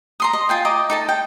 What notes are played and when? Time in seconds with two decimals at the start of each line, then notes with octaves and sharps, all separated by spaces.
0.20 A#5 C6 D#6
0.33 D#5
0.49 F4 G5 G#5
0.65 D#5 A#5 D6
0.90 D#4 A4 A5
1.09 G5